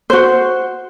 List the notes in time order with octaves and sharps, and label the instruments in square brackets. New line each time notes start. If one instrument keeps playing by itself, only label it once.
[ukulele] F#4 C5